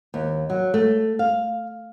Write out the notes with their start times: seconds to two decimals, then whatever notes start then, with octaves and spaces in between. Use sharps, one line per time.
0.14 D#2
0.50 F#3
0.74 A3
1.19 F5